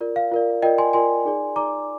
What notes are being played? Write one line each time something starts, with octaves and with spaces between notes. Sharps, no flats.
F4 A#4 D5
F5
F4 A#4 D5
F4 A#4 D5 D#5 G5
G#5 C6
F4 A#4 D5 G#5 C6
D#4 G#4 D5
D#4 G#4 D5 A#5 D6